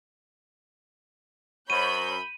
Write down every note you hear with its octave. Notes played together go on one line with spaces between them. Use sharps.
F#2 C5 C#5 B5 C#6 G6 D#7